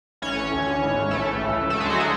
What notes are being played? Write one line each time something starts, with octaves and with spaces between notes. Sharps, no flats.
A1 A2 E3 C#4 C#5
D2 D3
G#1 G#2 E3
A1 A2 E3 A3 A4
C#2 C#3 E3
D2 D3 A3 A4
G#3 G#4
F#3 F#4
G#3 G#4